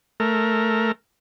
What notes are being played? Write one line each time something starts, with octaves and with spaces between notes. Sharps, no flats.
A3 A#4